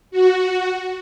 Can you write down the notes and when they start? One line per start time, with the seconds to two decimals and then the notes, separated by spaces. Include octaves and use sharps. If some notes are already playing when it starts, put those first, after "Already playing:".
0.11 F#4